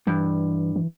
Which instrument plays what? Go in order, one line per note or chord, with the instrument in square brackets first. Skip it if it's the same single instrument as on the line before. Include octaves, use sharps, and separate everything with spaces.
[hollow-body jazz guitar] G2 [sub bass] E3
[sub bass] E3